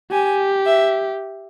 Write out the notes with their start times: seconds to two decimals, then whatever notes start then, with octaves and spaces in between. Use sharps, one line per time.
0.11 G4 G#5
0.66 E5